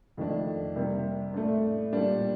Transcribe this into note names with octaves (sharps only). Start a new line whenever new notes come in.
F2 D#3 A3 D4
C3 G3 A#3
A2 A3 D4
A#2 G3 A#3 D4